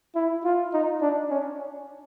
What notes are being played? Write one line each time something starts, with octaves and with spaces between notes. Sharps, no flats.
E4
F4
D#4
D4
C#4